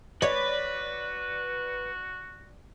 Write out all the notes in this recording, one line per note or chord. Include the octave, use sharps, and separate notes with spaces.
F#4 B4 C#5 D5